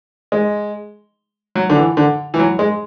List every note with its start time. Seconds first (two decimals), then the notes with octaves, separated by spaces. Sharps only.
0.32 G#3
1.55 F#3
1.70 D3
1.76 E3
1.97 D3
2.34 E3
2.39 F#3
2.59 G#3